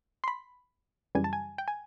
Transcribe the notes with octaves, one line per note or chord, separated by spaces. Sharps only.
C6
B5
F#2 C#3 E3 G3 G#5
A5
G#5
G5
G#5